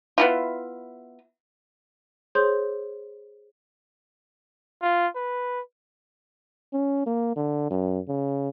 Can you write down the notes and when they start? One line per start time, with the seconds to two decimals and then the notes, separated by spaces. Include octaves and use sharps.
0.18 B3 E4 F4
2.35 G#4 C5 C#5 C6 G6
4.82 F4
5.16 B4
6.73 C#4
7.06 A#3
7.36 D3
7.70 F#2
8.08 C#3